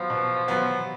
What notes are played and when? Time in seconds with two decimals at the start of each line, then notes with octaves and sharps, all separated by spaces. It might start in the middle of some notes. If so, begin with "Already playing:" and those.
Already playing: F3 F#3 B3
0.10 B2
0.48 F#3 B3